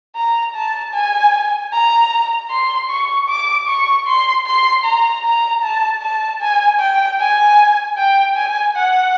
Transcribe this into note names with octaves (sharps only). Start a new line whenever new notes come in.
A#5
A5
G#5
A#5
C6
C#6
D6
C#6
C6
C6
A#5
A#5
A5
A5
G#5
G5
G#5
G5
G#5
F#5